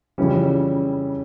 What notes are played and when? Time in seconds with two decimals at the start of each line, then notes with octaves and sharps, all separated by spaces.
0.18 F2 C#3 E3 G3 C#4